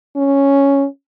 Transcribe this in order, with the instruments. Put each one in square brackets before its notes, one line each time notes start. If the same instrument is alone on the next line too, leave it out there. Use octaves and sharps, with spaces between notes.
[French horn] C#4